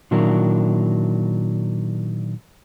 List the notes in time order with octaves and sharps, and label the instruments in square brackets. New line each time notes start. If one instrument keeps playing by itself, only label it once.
[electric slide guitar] A#2 D#3 F#3 D4 E4 A#4